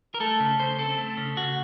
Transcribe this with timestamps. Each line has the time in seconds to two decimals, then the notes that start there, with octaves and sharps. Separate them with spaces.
0.14 A#4
0.20 A3 A4
0.40 C#3
0.59 C#3 C5
0.79 C4 A4
0.98 A3
1.17 C#3
1.37 C#3 F#4